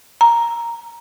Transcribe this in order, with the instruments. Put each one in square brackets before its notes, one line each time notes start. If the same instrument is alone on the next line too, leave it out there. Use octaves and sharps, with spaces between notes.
[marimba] A#5